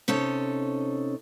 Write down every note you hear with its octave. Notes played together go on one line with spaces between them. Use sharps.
C3 C#4 D#4 A4 C#5